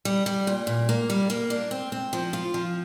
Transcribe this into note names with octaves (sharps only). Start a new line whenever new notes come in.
G3
G3
A#2
A#2
A#3
G3
A#3
D4
C4
C4
F3
F4
F3